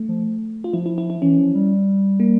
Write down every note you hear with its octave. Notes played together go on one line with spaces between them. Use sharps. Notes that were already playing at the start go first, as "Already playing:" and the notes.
Already playing: A3
F3
F4
F3 E4
E4
E4
E4
E3 C#4
F3
G3
A#3